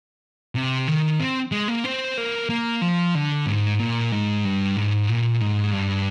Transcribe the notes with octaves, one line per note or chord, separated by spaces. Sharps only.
C3
D#3
C4
G#3
A#3
C4
A#3
A#3
F3
D3
G#2
A#2
G#2
G2
G#2
A#2
G#2
G2